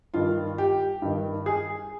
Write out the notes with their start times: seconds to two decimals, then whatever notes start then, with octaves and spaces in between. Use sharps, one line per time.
0.14 G2 D#3 F4
0.58 G4
1.02 G2 D#3
1.46 G#4